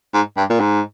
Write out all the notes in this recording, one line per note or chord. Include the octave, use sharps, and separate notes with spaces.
G#2
G2
A#2
G#2